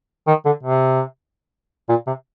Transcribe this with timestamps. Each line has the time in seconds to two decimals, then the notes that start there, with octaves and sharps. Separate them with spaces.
0.28 D#3
0.46 D3
0.64 C3
1.89 A#2
2.07 C3